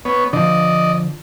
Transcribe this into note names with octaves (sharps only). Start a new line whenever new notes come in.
B3 C#5
D3 F3 D5 D#5